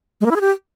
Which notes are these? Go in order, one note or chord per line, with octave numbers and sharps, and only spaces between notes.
G#3
A#3
E4
G#4
G4